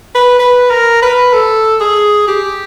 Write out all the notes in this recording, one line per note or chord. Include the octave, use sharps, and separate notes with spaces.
B4
B4
A#4
B4
A4
G#4
G4